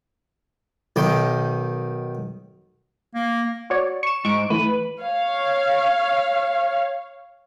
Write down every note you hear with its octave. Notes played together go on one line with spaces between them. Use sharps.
B1 D#3 G5
A#3
F#4 C#5 D5
C#6 E7
G#2 C#6 D7
E3 A3 B4
C#5 F5